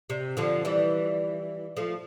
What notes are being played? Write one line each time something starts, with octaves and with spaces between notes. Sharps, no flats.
C3
D3 F3
E3 G3
F3 A3